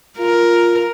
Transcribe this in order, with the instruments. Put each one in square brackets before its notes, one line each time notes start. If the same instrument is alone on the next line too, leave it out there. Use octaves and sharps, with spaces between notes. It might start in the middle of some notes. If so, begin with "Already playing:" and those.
[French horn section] F4 [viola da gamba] A#4